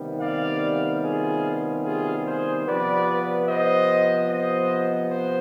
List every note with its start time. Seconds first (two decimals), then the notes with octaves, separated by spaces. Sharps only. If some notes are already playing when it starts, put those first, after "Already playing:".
Already playing: C3 D#3 G3 B3
0.21 D5 F5
1.03 F4 G#4
1.84 F4 G#4
2.25 G#4 C5
2.66 C3 F3 B3 B4 D5
3.47 C5 D#5
4.29 C5 D#5
5.10 C5